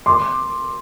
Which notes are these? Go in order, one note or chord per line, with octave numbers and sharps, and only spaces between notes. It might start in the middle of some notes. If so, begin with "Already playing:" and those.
C6 D6